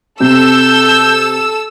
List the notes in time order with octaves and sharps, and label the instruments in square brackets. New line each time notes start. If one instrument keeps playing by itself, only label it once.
[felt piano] C3 [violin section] A4 E6 [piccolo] G6